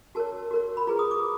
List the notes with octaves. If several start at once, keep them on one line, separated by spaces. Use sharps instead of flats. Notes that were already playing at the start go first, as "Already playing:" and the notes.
F#4 A#4 C#5 A5
F#4 A#4 C#5
B5
F4 G#4 B4 A#5
D#6
D6